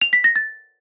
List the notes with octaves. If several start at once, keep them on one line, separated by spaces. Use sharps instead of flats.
F7
B6
A#6
A6